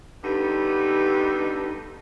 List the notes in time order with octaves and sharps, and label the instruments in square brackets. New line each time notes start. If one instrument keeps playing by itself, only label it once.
[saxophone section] G2 D3 B3 D#4